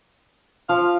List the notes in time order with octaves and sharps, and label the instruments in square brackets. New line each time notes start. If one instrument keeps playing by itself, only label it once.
[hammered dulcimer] F3 [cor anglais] F5